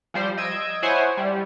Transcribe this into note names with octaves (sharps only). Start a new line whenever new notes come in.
F3 G3 C5
D#5 E6 G#6 D7
E4 C5 C#5 F#5 G#5
G3